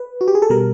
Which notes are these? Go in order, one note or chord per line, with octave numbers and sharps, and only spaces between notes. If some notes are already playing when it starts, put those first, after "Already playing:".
Already playing: B4
F#4
G4
G#4
A4
B2 G3 A#4